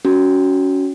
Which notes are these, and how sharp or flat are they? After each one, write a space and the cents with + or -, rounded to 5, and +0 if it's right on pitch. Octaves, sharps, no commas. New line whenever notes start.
C#4 +20 F#4 +5